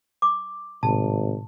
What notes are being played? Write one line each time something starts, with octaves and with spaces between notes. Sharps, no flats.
D6
G#1 A2 C3 A5